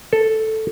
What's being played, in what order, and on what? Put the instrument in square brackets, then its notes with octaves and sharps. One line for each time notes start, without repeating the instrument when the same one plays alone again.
[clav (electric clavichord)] A4